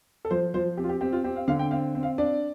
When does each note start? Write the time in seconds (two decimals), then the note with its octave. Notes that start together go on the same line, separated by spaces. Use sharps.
0.25 A4
0.31 F3 C5
0.54 F3 C5
0.77 C4 G4
0.84 F4
0.89 G4
1.01 C4 G4
1.13 F4
1.24 C4 G4
1.36 F5
1.48 D3 F5
1.59 G5
1.71 C4 F5
1.95 C4
2.03 F5
2.18 D4 D5